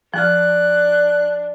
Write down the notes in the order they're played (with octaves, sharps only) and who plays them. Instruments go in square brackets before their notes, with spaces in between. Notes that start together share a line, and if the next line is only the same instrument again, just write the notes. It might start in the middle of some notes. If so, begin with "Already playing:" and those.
[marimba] F3 F6 [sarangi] D4 [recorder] F#6